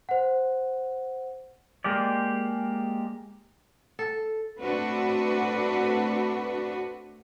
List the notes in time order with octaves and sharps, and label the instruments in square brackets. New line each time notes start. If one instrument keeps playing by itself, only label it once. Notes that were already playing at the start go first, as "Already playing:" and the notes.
[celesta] C5 F#5
[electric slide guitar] G#3 A#3 G4 D5
[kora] A4
[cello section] A3 C4 D4 F#4 B4